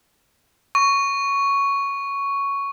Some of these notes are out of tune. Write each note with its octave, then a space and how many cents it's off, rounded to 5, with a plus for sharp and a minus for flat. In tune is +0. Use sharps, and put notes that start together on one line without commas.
C#6 +5